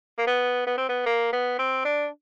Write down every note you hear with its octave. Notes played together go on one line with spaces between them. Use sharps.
A#3
B3
B3
C4
B3
A#3
B3
C4
D4